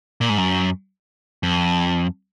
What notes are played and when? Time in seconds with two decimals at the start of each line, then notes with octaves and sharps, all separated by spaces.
0.21 A#2
0.29 G#2
0.38 F#2
1.43 F2